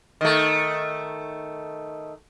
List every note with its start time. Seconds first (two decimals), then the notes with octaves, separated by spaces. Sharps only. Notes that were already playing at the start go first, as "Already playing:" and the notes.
0.21 D#3 A3